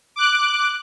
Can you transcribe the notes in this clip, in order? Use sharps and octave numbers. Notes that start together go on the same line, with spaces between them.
D6 F#6